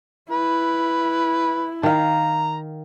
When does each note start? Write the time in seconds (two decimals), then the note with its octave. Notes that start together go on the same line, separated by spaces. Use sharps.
0.32 E4 B4
1.83 D#3 F5 A#5